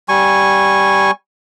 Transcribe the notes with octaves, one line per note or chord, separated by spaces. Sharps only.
G3 G#5 C#6